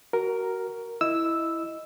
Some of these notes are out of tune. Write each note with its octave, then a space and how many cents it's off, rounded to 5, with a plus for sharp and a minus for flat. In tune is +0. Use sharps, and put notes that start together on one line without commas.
F#4 +25 A#4 +0
E4 +0 D#5 +5 E6 +0